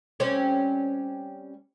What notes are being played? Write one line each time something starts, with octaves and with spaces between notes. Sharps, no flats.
G3 C4 C#4